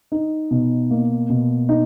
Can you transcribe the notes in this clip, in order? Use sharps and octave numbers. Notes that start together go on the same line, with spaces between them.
D#4
B2
A#3
B2
D#4